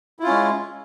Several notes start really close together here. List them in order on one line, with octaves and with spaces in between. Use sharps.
E4 F4 C#4 G#3